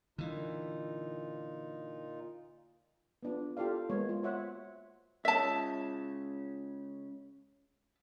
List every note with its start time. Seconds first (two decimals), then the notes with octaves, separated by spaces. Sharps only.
0.18 A#2 D3 E3 D#4 F4
3.23 B3 D4 F4
3.57 F4 G4 A4 D5 F5
3.90 G#3 A#3 B3 C#5
4.09 F4
4.23 F#4 C5 C#5 E5 F#5
5.25 C#3 G#3 C#4 E5 A5